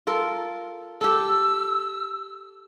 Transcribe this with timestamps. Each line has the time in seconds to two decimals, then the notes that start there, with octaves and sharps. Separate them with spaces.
0.07 F4 A4 A#4
1.01 G4 A4 E6